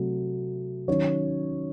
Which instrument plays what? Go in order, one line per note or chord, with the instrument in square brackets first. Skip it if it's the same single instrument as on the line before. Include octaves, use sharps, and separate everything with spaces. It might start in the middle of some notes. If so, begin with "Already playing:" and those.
Already playing: [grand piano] C3 F#3 A3
D#3 F#3 C#4 C#5